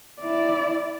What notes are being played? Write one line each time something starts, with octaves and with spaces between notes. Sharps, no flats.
E4 D5